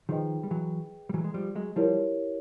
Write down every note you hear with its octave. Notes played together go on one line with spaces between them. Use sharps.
D#3 F3 G#4 B4 D#5 G5
G3
E3 F#3
G3
E3 F#3
G#3
F3 G3
F#3 G#3
F3 G3 E4 G4 A#4 C#5